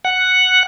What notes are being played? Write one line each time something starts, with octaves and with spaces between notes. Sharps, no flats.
F#5